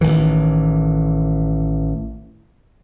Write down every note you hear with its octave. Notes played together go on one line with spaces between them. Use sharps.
A1 D#3 E3